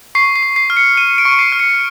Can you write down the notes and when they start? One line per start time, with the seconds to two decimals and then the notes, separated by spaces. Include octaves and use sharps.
0.15 C#6 C7
0.36 C7
0.43 C#6
0.56 C7
0.70 F6
0.77 C#7
0.97 F6 D#7
1.18 D7
1.25 C#6
1.39 C7
1.52 F6
1.59 C#7